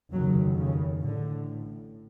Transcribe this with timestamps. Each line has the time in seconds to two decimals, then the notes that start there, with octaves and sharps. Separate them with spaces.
0.11 F1 D#2 C#3 F#3
0.57 C#3
1.03 A1 A2 D3